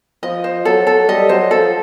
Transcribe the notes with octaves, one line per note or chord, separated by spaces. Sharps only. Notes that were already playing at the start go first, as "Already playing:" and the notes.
F3 D#5
C5
F#3 A4
A4
G3 D#5
F#3 C5
F3 A4